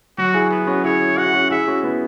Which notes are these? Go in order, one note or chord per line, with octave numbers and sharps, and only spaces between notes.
F#3 F#4
E4 G#4
B3
C#4 F#4
E4 G#4 C#5
F#4 F#5
E4
C#4 F#4
E4 G#4 E5
C#4 F#4
B3 E4